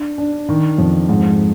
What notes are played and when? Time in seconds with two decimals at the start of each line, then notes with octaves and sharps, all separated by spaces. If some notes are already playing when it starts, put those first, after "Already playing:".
Already playing: D4
0.18 D4
0.49 D#3
0.78 F2
1.09 G#2